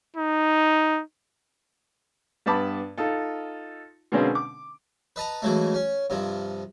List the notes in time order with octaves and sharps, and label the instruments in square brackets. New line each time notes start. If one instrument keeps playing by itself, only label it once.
[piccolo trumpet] D#4
[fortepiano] G2 B3 A5 B5 D6
D#4 F4 A4
B2 D3 G#3 A#3 C4 C#4
D6
[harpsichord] B4 D#5 A5 A#5
C#3 E3 F#3 G#3 A3
C#4
G2 C3 F3